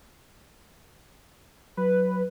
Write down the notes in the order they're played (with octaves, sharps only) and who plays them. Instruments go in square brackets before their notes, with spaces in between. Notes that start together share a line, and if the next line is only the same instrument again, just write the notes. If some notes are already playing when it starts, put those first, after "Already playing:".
[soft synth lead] F#3 [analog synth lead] B4